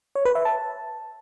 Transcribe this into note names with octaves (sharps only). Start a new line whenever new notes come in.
C#5
B4
E5
A5